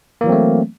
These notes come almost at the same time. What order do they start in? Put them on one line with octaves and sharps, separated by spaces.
A#3 E3 F#3 C4 A3